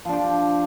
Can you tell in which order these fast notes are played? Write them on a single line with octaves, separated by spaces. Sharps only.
F3 D4 G4